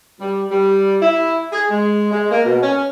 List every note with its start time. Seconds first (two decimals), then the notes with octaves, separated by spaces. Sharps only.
0.20 G3
0.50 G3
1.02 E4
1.52 G#4
1.70 G#3
2.11 G#3
2.31 A#3
2.45 B2
2.63 C#4